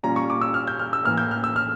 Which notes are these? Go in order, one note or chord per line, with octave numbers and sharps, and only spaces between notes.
A#2 G3 C#4 F4 A#5
C#6
D6
E6
F6
G6
F6
E6
A2 E3 A#3 F6
G6
F6
E6
F6